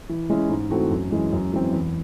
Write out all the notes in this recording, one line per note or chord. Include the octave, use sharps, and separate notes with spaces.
E3
G#3 C#4 E4
G#2
E3 A3 C4 F#4
F#2
E3 G#3 C#4
F#2
E3 G#3 C4
E2